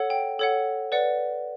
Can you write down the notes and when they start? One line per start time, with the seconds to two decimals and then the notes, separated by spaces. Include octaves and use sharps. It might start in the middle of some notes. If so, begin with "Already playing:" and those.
Already playing: A4 C#5 F#5
0.10 G5
0.39 A4 C#5 F#5
0.92 B4 D5 F#5